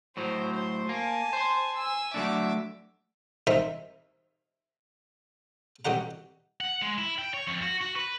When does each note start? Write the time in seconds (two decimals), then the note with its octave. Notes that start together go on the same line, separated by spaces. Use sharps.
0.17 A2 F#3 C5
0.54 C5 C6
0.89 A#3 G#5 A5
1.33 C5 C6
1.76 G#5 E6
2.14 F#3 A3 D4 E5 D6
3.47 C2 C4 D#4 A#4 E5 B5
5.85 C2 B2 G4 F#5 A#5
6.61 F#5
6.82 G#3
6.98 E4
7.19 G5
7.34 C#5
7.47 F2
7.62 F#4
7.81 F#4
7.96 B4